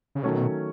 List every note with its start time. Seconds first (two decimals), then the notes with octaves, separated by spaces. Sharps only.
0.15 C#3
0.23 B2 D#3 F#3 A3 C#4